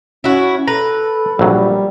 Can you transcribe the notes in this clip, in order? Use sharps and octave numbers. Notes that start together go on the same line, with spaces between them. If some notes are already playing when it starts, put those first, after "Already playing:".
C#4 E4 F#4
A4 B4 A#5
A#1 F#3 G3